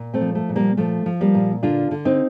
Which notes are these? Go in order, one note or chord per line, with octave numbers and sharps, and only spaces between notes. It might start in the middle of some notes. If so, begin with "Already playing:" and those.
Already playing: A#2
A3 C4
F3
A3
A#2
G3 A#3
F3 A3
F3
G3 A#3
A#2
D3 D4 F4
D3
C4 D#4